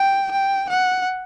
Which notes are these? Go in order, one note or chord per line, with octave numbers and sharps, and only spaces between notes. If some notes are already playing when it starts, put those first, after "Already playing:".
Already playing: G5
G5
F#5